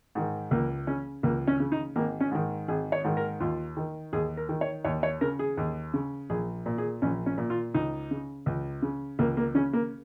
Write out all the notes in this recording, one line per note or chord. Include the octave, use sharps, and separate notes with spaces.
G#2 D#3
C#2 A#3
C#3 C#4
C#2 A#3
C#4
C#3
D#4
G#1 A#3
C#4
G#2 D#3
G#1 G#4
C#5
G#2 D#3
A#4
D#2 F4
D#3
D#2 G#4
A#4
D#3
C#5
D#2 C#5
C#5
C#3 A#4
G#4
D#2
C#3
A#1 G#4
A#2
G#4
A#1 C#4
C#4
A#2
F4
C#2 D#4
C#3
C#2
C#3
C#2 A#3
A#3
C#3 C#4
A#3